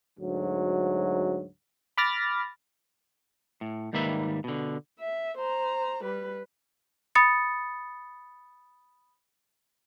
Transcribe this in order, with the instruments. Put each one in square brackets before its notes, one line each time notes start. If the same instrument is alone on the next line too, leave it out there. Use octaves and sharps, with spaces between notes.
[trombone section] D2 G#2 F#3
[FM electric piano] B5 D6 F6 A6 A#6
[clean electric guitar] A2
G#2 D#3 G3 A#3 B4 E5
B2 D3
[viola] E5
C5 A#5
G3 B4
[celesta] B5 D#6 A6 C#7